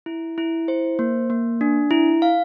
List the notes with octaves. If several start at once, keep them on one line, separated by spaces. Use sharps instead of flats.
E4
E4
C5
A#3
A#3
D4
E4
F5